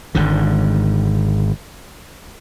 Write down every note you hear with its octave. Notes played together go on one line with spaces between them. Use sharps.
G#1 G#2 D3